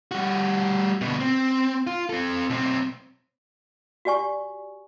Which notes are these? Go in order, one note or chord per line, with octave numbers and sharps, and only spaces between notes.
G3 F#4
D2 B2
C4
F4
C4 A4
B1 C4
F#4 G4 D5 G#5 C#6